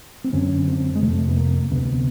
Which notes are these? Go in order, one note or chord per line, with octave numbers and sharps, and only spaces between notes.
C4
F#2 D3 C#4
C4
G#3
F2 C3 A3
B3
A#3
D2 C3 B3